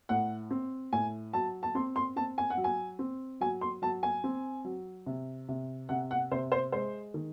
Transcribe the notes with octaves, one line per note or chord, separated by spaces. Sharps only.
A2 F#5
C4
A2 G#5
F#3 A5
A5
C4 C6
C6
C4 A5
G#5
F#5
F#3
G#5
C4
F#3 G#5
C6
F#3 A5
G#5
C4
F#3
C3
C3
C3 F#5
F#5
C3 C5
C5
G#3 C5
D#3